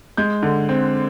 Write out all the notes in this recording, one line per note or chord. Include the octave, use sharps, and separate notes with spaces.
G#3 G6
D3
C4